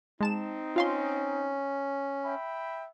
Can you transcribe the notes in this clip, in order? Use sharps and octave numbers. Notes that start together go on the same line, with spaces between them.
G#3 C4 D#4 A5 E7
C#4 F4 F5 C6
E5 G5 B5